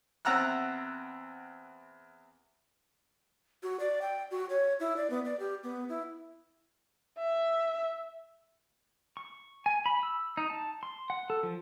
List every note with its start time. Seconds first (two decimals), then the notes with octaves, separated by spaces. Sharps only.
0.25 E2 C4 F#5 A#5 E6 F#6
3.63 F#4
3.80 D5
4.02 G5
4.31 F#4
4.50 C#5
4.80 E4
4.97 D5
5.10 B3
5.25 D5
5.40 G4
5.63 B3
5.89 E4
7.18 E5
9.17 C#6
9.66 G#5
9.86 B5
10.03 E6
10.37 D#4
10.50 A5
10.83 C6
11.10 F#5
11.30 A4
11.43 F3